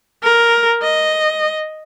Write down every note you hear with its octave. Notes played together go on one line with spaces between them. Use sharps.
A#4
D#5